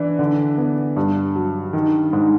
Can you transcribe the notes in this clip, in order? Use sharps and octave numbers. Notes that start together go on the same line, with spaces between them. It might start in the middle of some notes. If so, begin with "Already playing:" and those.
Already playing: E3 D4
D3
B3
G2
F#3
D#3
G#2